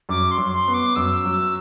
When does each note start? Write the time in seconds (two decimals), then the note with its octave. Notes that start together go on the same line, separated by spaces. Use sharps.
0.09 F#2 D6
0.31 C6
0.38 F#2
0.52 C6
0.68 B3
0.74 D6
0.96 F#2 E6
1.25 F#3